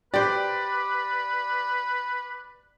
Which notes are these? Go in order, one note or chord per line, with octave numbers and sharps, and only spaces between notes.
G4 B4 C5 D5